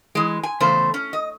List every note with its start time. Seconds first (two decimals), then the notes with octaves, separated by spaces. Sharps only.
0.15 E3 G#3
0.43 G#5
0.60 E2 C#3 A3 C5
0.94 C#4
1.13 D#5